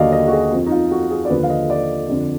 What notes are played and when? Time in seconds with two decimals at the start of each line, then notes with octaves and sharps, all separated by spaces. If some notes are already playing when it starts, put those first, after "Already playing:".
Already playing: D#2 D3 F#3 D5 D#5 F5
0.12 D#5
0.27 F#4
0.32 G#4
0.52 F2 F3
0.66 D#4
0.72 F4
0.91 F#4
1.11 G#4
1.25 D5
1.30 D#2 D3 F3 B4
1.43 F5
1.50 D#5
1.70 D5
2.08 F2 D3 F3